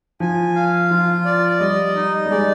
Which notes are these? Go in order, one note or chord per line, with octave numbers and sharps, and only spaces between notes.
F3 G#5
F5
F3 F4
D5
G3 D#5
D#4
G3
G#3 D5